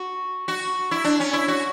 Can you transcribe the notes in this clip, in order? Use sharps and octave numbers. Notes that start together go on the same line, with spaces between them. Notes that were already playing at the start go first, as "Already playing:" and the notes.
Already playing: F#4
F#4
E4
D4
C#4
E4
F#4